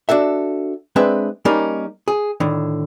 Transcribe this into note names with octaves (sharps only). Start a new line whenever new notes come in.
D4 F#4 A4 E5
G#3 C4 D4 B4 E5
G3 A#3 C#4 D#4 A#4
G#4
A2 D3 D#3